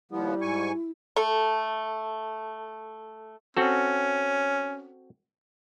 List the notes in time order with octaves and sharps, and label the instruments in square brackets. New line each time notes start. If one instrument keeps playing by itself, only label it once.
[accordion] D#2 F3 B3 [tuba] G3 [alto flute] E4
[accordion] G#2 G#5 C#6
[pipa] A3 A4
[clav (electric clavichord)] C4 F#4 A4 [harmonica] C#4